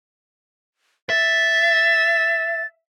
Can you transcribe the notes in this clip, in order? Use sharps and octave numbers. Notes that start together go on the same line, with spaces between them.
E5 A6